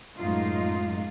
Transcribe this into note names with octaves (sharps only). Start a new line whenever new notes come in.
F#2 A2 G#3 D#4 F4